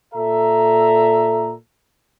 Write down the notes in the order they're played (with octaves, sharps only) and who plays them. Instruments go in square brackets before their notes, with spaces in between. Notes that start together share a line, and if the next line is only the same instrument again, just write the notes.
[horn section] A#2 A4 E5 A#5